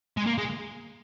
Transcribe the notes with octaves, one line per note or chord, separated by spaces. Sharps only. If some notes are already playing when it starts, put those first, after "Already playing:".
G#3
A#3
G#3